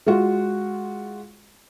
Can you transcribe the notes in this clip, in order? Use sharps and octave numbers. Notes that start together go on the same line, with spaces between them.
G#3 F4 F#4